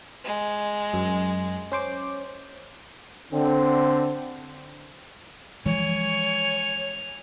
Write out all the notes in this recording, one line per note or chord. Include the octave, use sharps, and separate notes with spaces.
G#3
F#2
C#4 C5 D6
D3 C4
E3 F3 G#3 C#5 G#5 F7